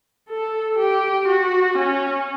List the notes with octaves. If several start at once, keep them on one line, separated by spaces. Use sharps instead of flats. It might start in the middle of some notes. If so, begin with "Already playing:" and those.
A4
G4
F#4
C#4